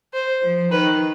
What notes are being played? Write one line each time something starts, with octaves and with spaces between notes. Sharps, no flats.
C5
F3
D#3 B4